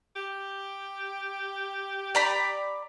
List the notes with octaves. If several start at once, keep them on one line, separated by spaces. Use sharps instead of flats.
G4
D5 A#5 B5